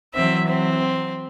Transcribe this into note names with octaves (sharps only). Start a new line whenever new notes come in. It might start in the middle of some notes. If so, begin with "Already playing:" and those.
E3 F#3 C4 E5
C4